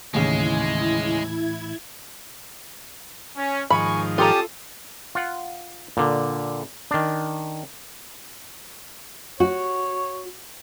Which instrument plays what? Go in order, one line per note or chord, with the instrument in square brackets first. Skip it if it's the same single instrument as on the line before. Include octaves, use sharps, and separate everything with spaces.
[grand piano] D#2 C#3 [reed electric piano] A2 E3 A3 [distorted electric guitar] G#3 [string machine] E4 G#6
[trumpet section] C#4
[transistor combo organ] G#2 D#3 F3 [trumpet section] G#3 G#5 C#6 [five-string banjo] B5
[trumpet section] C#4 A5 D#6 [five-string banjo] F4 A4 A#5 [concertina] G4
[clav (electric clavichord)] F4 F#5
A#2 D3
D#3 D4
[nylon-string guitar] F#4 [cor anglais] C#5